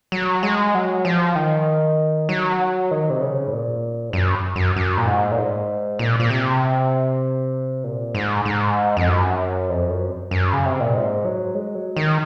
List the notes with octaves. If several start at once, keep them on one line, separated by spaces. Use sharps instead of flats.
F#3
G#3
F#3
F3
D#3
F#3
D#3
C3
C#3
G#2
A#2
G#2
F#2
F#2
F#2
A#2
G#2
A#2
G#2
A#2
A#2
C3
A#2
G#2
G#2
F2
F#2
F2
F#2
F#2
C#3
C3
A#2
G#2
F#3
G#3
F#3
D#3